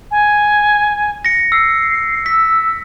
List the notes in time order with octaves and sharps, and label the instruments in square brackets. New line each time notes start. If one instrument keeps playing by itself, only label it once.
[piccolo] G#5
[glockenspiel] A#6 C#7
[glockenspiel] E6 [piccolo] C7
[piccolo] E6 [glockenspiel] B6